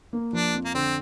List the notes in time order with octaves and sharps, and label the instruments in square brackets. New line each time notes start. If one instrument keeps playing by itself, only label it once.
[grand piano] A#3
[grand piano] F3 [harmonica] D4
[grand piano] F2
[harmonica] A#3
[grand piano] D3 [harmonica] C4